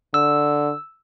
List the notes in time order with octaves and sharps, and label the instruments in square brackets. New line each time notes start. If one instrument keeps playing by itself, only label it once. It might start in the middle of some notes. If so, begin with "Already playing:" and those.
[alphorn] D3 [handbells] E6